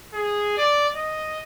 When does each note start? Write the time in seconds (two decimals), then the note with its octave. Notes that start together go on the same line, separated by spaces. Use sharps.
0.13 G#4
0.57 D5
0.95 D#5